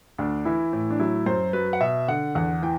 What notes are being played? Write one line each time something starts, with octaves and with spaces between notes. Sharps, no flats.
D2 D4
E3 E4
A2
D4
F#3 E4
F#2 C5
F#3 B4
F#5
B2 E5
D3 F#5
E2 F#5
E3 G5